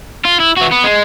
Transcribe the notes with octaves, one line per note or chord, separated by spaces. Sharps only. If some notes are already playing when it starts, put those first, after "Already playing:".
F4
E4
E3 F#4
B3
G#3